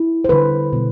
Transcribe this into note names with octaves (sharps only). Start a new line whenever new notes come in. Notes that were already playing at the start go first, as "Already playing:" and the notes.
Already playing: E4
C5
D3 G3 B4
B2 G3